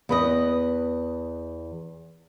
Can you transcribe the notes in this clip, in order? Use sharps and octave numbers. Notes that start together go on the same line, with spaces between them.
E2 B4 D#5